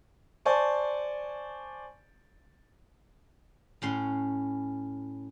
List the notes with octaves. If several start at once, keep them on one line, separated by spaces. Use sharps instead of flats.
C5 D5 G#5 A5 C#6
A2 C#4 C6